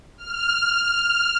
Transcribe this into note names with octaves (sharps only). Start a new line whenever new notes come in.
F6